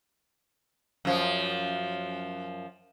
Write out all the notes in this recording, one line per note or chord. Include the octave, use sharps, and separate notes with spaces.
F#2 F3